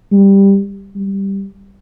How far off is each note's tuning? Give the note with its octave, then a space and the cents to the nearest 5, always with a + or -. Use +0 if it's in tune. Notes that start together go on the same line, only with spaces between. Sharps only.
G3 +5
G3 +0